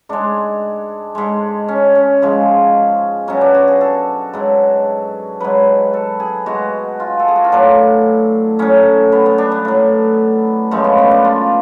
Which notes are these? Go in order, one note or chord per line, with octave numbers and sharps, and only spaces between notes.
G#2 G#3 D4
G#2 G#3
C#4
C#4
G#2 F3 G#3
B2 F#3 C#4
D4
F#4
G#4
A4
G#2 F#3
G#2 F#3 B4
A4
G#4
B2 G#3 F#4
F4
A4
G#4
F#4
F4
A2 F#3 D4
A2 F#3 C#4
B3
B3
D4
B3
A2 F#3
F#2 F3 G#3 A3
B3
B3
D4
F4